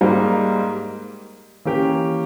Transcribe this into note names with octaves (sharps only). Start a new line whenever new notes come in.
G#2 G3 A#3
E3 A#3 C#4 G4